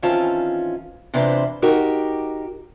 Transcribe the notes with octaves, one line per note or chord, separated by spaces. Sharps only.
D#3 E3 C4 C#4 F4 A5
C3 E3 D4 F4 B4 C5
D#4 F#4 G4 A#4